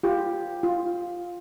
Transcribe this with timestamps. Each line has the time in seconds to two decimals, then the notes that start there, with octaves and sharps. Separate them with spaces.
0.03 F4 G4
0.63 F4